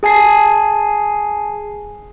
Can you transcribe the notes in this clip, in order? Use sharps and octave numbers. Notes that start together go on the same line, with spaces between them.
G#4 G#5 A5 C7